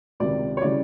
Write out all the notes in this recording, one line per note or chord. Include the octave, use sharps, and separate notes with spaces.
C#2 C3 D#3 D5
C#5
C#3 E3 G3 D5